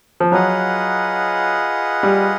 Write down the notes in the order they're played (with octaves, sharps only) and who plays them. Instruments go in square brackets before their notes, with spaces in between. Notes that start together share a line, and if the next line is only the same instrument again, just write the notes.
[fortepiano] F3
[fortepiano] F#3 [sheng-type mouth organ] F4 G#4 B4 D#5 F#5
[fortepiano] G3